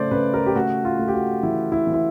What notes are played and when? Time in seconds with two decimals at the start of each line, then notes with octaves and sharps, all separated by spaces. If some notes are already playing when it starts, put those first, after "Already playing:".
Already playing: C#3 A3 C5 D5
0.11 C#3 B4
0.34 A#4
0.46 G4
0.56 A3 F#4
0.85 F4
0.99 A3
1.08 G4
1.14 F#4
1.43 E3 E4
1.72 E4
1.87 E3
1.94 E4